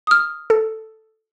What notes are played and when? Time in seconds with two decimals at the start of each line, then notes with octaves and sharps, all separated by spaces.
0.07 D#6 F6
0.50 A4